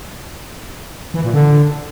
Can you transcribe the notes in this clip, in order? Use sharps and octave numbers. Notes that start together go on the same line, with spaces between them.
E3
A#2
D3